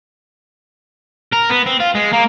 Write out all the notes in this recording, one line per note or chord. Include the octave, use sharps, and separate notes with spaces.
A#4
B3
C4
F4
G#3
A#3